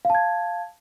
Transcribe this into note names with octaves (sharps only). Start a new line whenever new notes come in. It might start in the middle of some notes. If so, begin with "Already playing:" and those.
F5 A5 G#6